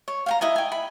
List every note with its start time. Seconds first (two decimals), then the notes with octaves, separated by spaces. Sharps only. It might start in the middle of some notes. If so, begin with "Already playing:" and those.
0.08 C#5
0.26 F5 G5 A#5
0.41 E4 D#5 G#5
0.56 G5 G#5
0.72 B5